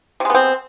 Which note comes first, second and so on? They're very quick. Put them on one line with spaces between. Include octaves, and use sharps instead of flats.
C3 G#3 B3 C4